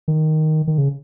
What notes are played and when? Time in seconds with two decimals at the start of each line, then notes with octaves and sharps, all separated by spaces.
0.08 D#3
0.67 D#3
0.78 C#3